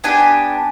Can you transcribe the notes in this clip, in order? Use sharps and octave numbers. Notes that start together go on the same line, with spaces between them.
B3 D4 G4 G#5